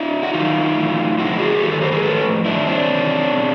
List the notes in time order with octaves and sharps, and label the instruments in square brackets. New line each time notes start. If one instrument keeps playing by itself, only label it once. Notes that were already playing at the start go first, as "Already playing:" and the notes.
Already playing: [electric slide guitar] D4 E4
F#4
F#2 D#3 D#4 F4
A2 E3
F2 D3 F3 E4 F#4
F#4 G#4
G2 D#3 G4 A4
A4 B4
A#4 C5
G#4 A#4
A2 F3 A4 B4
G2 D#3 D4 E4
C4 D4
E2 C3 D#3
B2